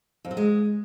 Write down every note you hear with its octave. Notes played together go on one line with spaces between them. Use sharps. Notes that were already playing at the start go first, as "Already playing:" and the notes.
F2
F#3
G#3